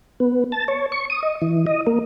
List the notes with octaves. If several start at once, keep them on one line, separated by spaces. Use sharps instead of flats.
B3
A5
C#5
C#6
D#6
D#5
E3
D#5
A#3